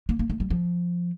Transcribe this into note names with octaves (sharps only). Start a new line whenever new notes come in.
A#3
A#3
A3
G3
F3